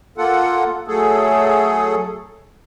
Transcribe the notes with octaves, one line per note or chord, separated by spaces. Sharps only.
A#3 F4 A4 F#5
F#3 A3 G#4 A4